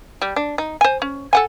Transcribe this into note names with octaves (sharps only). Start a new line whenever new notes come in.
G3
D4
D#4
C5 G#5
C#4
A4 F#5 G#5